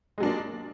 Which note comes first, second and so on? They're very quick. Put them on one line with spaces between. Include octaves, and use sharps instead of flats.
G#3 F#3 D4 A#3